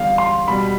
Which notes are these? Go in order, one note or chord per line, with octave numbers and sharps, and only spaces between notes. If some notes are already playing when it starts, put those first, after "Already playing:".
Already playing: E2 D3 G3 F5
C6
B2 G3 B5